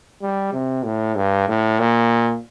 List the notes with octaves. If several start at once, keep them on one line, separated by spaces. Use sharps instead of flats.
G3
C3
A2
G2
A2
A#2